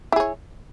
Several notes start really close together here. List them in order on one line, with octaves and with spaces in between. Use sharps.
E4 G#4 C#5